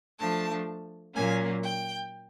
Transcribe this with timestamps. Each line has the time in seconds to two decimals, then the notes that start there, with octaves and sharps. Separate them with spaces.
0.18 F3 A3 D4 A5
1.14 A#2 F#3 A#3 C#4 G#5
1.62 G5